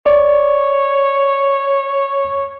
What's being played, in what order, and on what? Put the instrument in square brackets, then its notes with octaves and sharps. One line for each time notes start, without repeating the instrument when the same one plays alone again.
[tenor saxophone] C#5 [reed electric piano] D5